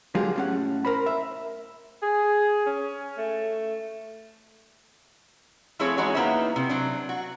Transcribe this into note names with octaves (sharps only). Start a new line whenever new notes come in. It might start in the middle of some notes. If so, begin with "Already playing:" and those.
D3 F#3 G#3 F4 G4 G#4
A2 C#4 F#5
A#4 C5 B5
E5
G#4
C#4
A3
F3 A3 C4 E4 G#4 C#5
E3 G#3 D#4 F#4 C#5
A#3 B3 D#4 E4 C5 E5
C3
F#3 C4 D4
F#4